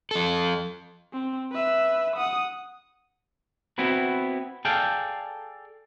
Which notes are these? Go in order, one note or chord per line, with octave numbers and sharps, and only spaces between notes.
F3 A4
C4
B4 E5
F#5 D#6
B3 C4 E4 F#4 B4
G#4 A4 D5 F5 G5